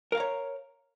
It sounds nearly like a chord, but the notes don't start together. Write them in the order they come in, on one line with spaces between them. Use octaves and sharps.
A#4 F5 A#5 C#5